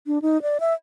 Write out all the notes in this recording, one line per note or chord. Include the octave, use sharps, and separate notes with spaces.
D4
D#4
D5
E5